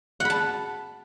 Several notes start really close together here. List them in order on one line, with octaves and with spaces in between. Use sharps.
F#5 B5 A5